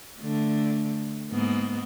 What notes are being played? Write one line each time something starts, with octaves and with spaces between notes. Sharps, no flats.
D3 A3
G#2 A#3 B3